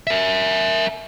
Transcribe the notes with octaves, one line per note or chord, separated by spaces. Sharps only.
A#4 E5